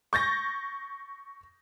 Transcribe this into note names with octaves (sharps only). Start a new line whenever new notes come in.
C#6 G6 A6 A#6